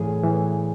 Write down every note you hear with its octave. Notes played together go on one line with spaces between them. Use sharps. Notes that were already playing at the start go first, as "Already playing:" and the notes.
Already playing: A2 E3 G#4
A2 E3